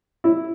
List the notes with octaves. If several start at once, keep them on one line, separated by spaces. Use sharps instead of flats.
E4